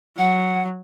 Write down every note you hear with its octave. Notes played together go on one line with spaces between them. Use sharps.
F#3 F#5